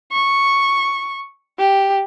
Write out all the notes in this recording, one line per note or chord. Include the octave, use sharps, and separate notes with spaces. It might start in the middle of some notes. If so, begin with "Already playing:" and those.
C#6
G4